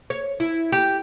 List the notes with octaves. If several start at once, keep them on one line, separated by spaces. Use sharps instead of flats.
C#5
E4
G4